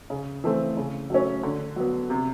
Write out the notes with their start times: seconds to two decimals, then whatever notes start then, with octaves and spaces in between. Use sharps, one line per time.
0.10 C#3
0.44 E3 A3 C4
0.77 C#3
1.10 F#3 A3 C#4
1.43 D3
1.76 F#3 B3
2.10 C3